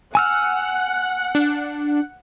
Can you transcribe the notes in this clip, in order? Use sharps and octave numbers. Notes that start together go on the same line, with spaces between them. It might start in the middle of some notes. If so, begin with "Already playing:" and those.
F#5 G#5 E6 F6
D4